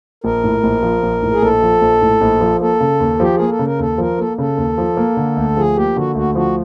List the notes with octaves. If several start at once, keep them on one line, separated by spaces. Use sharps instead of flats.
A#1 A#4
A2
A#1
F3
A#1
A2
G#4
A#1 A4
F3
A#1
A2
A#1
F3
A#3 A4
C#3
D#2
F3 G4
A#3 G#4
A4
C#3
A#4
D#2 A4
F3 A#4
A#3 A4
C#3 A4
D#2
F3
A#3
D3
D2
F3 G#4
A#3 G4
D3 F#4
D2 F#4
F3 F#4